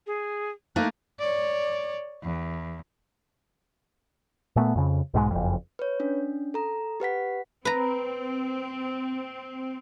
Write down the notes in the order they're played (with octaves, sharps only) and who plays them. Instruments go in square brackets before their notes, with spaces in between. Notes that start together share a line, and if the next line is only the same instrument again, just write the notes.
[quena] G#4
[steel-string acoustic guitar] A3 A#3 D#4 [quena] F#6
[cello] C#5 D5
E2
[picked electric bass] A#2 A3 B3
F2 C#3
B1 G#2 F#3 G#3
F#1 F2
[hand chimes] B4 C#5
C#4 D4
A4 A#5
G4 B4 F#5 B6
[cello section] C4 [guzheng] B4 A#5